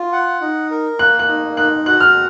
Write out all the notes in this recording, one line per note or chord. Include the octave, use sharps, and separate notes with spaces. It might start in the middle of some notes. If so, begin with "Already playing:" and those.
Already playing: F4
F#5
D#4
A#4
A#3 F#6
F#6
D#4
D#4 F#6
F#4 F#6
F6